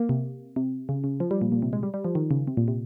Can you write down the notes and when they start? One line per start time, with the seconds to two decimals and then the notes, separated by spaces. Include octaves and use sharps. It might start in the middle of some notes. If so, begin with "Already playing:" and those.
Already playing: A#3
0.09 C3
0.56 C3
0.89 C#3
1.04 C#3
1.20 F3
1.31 G3
1.42 A#2
1.52 A#2
1.62 C3
1.73 G#3
1.83 G3
1.94 G3
2.05 F3
2.15 D#3
2.31 C#3
2.47 C3
2.57 A#2
2.68 C3